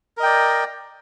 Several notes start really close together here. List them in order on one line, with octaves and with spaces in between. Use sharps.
A#4 D#5 G5 D5